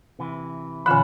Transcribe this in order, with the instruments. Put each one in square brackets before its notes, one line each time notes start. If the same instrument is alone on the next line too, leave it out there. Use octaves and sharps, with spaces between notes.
[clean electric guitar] C3 E3
[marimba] A#2 D3 E3 [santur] C#4 F4 F#5 [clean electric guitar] B5